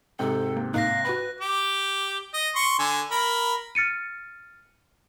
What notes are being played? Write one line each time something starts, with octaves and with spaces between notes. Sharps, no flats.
G#2 C3 A4 G5
A#3
A2 A#3 D#4 F5 F#6 A#6
F#4 B4 B5
G4 D6
D#5
C6 C#6
D3 G#5
A#4 B5
F6 A6 C#7 D#7